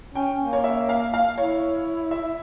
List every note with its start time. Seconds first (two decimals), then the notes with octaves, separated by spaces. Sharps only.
0.15 C#4 G5
0.39 A#3
0.53 C#5
0.64 E5
0.89 F5
1.14 F5
1.38 E4 C#5
2.11 E5